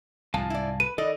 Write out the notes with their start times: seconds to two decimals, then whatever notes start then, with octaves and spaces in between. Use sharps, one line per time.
0.34 C2 G#2 F3 F5 G#5 A5
0.50 E4 D5
0.80 B4 D#7
0.98 D#3 A4 D5 D#5